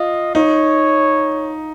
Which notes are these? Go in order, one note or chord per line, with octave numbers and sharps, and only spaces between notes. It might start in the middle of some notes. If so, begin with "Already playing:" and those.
Already playing: F4 D#5
D#4 C#5